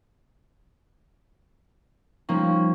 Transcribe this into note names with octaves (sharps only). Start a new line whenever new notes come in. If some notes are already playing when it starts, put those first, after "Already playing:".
F3 G3 A#3 C#4 D#4 C#6